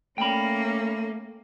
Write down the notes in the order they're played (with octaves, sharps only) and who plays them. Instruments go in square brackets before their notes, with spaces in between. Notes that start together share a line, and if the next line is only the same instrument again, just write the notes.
[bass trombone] A3 [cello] A#3 C#4 [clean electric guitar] G5 B5